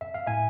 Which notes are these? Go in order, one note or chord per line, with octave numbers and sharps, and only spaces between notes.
E5
F5
A2 E5 G#5